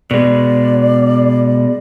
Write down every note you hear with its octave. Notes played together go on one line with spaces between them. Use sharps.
B2 G#3 D5